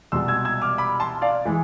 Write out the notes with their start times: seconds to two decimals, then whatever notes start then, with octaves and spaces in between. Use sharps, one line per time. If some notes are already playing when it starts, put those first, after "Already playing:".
0.12 C2 B2 G#3 C6 E6
0.28 E6 G#6
0.45 E6 G#6
0.62 D6 F6
0.78 B5 D6
1.00 A5 C6
1.22 D5 F5
1.45 E3 G#3